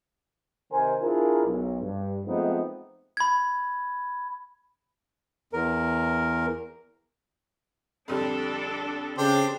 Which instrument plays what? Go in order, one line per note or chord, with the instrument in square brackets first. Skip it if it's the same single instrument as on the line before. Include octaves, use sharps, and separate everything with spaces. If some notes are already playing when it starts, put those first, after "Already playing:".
[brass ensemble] C3 D#3 A#4 C5 G#5
D4 E4 F4 G#4 A#4
B1
G2
F3 G#3 A3 B3 C4 D#4
[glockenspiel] B5 G#6
[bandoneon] E2 A#4
[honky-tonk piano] F2 D3 G3 [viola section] D4 A4
[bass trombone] C#3 [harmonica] D4 G4 C5